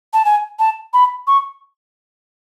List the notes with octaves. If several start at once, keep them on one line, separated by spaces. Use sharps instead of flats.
A5
G#5
A5
B5
C#6